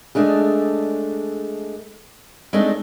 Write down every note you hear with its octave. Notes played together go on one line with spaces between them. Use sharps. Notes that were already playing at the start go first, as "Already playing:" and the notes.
G#3 A3 D4 G#4
G#3 A3 C4 D4 D#4